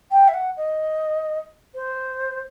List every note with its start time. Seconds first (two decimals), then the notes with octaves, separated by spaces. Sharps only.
0.11 G5
0.28 E5
0.33 F#5
0.57 D#5
1.74 C5